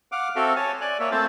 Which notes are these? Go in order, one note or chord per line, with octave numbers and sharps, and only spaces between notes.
F5 F#5 D6
C4 F#4 A4 E5 F5
C#5 G#5 A5
D5 G#5 F#6
A#3 C#5 E5
A3 C4 F4 C5 E5 A5